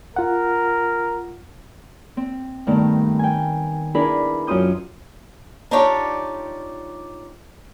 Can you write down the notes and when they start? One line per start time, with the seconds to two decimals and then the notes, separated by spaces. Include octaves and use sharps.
0.16 F4 A#4 F#5
2.17 C4
2.67 G2 D#3 G3 A3 B3
3.19 G5 G#5
3.95 D4 E4 G#4 A#4 B4 B5
4.47 F#2 C#4 F4 C5 D#6 G6
5.71 D4 D#4 F4 G4 C#5 D5